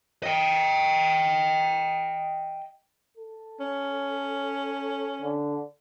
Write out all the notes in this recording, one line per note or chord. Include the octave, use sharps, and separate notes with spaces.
D#5 G5
A4
C#4
D3